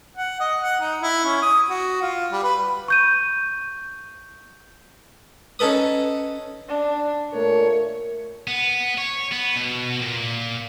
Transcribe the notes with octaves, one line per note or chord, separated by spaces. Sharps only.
F#5
D#5
F#5
D#4
E4
C#4
D#6
F#4
F4
G3
B4
C#6 G6 D#7
C#4 D#4 A4 B4 D#6
D4
A#2 A3 A#4 C#5
B3
C#5
B3
B2
A#2